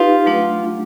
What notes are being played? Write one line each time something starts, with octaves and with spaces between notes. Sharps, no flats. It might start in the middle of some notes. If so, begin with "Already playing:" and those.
Already playing: D#4 F4 G4 B4
F#3 A3 D4